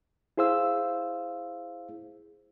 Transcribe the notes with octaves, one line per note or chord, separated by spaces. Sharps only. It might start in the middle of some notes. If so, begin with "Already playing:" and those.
E4 G#4 C5 F5 E6